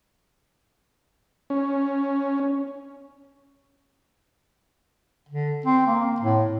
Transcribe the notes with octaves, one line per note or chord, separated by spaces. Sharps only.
C#4
D3
C4
A#3
A2